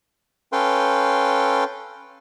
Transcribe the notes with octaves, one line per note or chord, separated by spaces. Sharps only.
C#4 A4 B4 F5 G5 C6